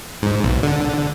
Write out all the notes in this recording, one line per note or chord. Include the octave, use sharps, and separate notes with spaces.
G#2
B1
D3